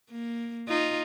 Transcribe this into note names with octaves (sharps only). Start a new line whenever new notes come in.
A#3
D#4 F4